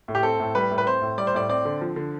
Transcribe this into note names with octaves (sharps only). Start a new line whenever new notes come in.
A2
G4
C4 A4
A2
G3 B4
A2
B4
C4 C5
A2
G3 D5
C5
A2 D5
C4 D5
D3
F3
D3